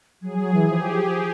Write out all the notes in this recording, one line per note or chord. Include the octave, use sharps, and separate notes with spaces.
F#3 G#4
F#3
E3
F3 G4
F3
F3
F3